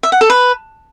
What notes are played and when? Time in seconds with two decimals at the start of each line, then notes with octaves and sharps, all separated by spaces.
0.03 E5
0.12 F#5
0.21 A4
0.30 B4